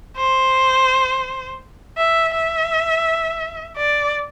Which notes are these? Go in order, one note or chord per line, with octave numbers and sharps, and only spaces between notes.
C5
E5
E5
D5